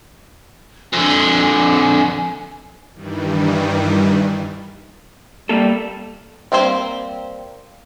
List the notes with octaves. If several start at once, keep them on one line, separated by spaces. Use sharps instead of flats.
F2 D3 G#5
G2 D#3 E3 G3
G3 A#3 A4
G3 A#3 C4 E4 C5